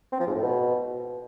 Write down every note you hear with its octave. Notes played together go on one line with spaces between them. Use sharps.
C4
F3
G#2
A2
B2